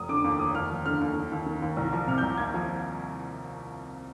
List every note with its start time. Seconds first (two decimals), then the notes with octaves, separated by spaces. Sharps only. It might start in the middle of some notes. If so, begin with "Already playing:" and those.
Already playing: F1 D#6
0.09 D3 D6
0.24 D#2
0.39 F1 D#6
0.54 D#2 F6
0.70 F3
0.86 D3 F6
1.01 D#2
1.16 D#3
1.32 D#2
1.46 D#3
1.62 D#2
1.77 C2
1.93 F3
2.07 C3 F6
2.18 G6
2.22 C2
2.38 D#2 G#6
2.54 F3